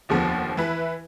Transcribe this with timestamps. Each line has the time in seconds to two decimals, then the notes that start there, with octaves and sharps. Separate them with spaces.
0.09 F1 D#2 D3 F3 B3
0.57 E3 E4 B4